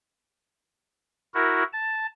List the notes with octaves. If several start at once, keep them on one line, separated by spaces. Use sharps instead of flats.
E4 F#4 A#4
A5